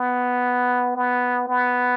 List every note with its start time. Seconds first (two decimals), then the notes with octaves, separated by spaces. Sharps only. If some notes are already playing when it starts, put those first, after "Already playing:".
Already playing: B3
0.96 B3
1.48 B3